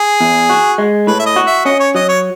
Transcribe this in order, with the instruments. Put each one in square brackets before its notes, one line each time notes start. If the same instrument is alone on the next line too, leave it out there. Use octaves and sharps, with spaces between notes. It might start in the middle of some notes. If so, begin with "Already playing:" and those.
Already playing: [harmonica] G#4
[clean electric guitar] E2
F#4
G#3
[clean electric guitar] A2 [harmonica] B4
[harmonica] E5
D#5
[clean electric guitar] F#4
[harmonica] E5
[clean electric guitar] C#4 [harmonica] D#5
[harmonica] C#5
[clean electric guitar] F#3 [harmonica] D#5
[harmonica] C#5